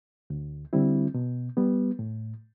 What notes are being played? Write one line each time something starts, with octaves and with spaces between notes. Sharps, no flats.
D2
D3 G3 C4 E4
B2
G3 B3
A2